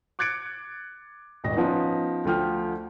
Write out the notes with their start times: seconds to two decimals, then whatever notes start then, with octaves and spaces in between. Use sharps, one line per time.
0.19 D6 F#6 G#6 A6 C#7 D7
1.44 D#1 G#1 D#5 A#6
1.56 F3 B3 C#4 D#4
2.25 D2 D3 F3 G5 F6